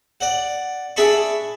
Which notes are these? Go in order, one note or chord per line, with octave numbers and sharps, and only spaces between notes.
D5 F#5
D4 G#4 E5 A5 B5 C#6